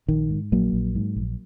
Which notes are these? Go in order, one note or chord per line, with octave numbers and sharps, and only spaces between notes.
A#1 D#3
G#2
A#1 F#3 A#3
A#1
G#2
A#1